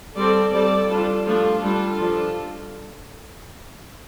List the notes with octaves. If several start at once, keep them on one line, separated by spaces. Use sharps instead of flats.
G3 C4 A4 D5
G3 C4 A4 D5
G3 D4 F4 A4
F3 A3 D4 F4 A4
G3 D4 F4 A4
F3 D4